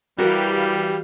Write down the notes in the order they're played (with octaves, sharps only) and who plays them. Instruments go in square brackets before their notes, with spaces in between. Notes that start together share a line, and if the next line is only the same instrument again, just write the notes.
[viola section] E3 G4 F5 [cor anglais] G3 [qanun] F#4 A#4